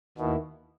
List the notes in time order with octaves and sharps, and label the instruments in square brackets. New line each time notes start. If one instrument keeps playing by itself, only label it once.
[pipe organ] D#2 D#3 A#3 E4 [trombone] B2